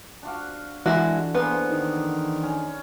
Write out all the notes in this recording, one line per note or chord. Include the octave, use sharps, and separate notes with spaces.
D4 F#4 F5
D3 E3 G#3 E4 F#4
A#3 B3 G#4 C5
D#3
C#4